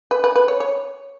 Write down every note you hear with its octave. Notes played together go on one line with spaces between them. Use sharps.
B4
B4
B4
C#5
C#5